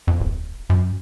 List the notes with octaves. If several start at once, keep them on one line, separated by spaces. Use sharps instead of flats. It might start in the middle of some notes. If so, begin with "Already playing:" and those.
F2
D1
F#2